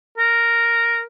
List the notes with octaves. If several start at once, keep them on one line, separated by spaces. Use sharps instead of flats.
A#4